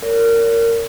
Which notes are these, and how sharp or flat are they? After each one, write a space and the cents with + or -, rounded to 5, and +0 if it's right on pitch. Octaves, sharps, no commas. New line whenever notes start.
A#4 -20 C#5 +40